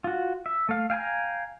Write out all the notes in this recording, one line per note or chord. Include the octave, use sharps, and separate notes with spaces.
F4 F#4
E5
A3 F5
F5 G5 G#5 A#5